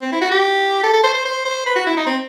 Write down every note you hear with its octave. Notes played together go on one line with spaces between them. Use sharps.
C4
E4
F#4
G4
A4
A4
C5
C5
C5
C5
B4
F#4
E4
D#4
C4